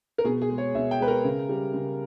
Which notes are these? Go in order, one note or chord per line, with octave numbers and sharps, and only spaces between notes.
A#4
B2 G#4
G#4
G#3
C#5
B2 E5
G5
G#3 B4
A#4
C#3
G3
C#3